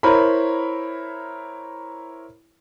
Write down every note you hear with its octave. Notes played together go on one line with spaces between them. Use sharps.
E4 A#4 C5 C#5 A#5 B5